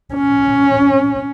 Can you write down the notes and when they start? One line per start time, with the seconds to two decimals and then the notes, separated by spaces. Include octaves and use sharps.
0.14 C#4